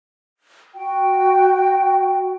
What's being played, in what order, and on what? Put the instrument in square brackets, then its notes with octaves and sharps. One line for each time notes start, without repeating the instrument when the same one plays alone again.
[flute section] F#4 G5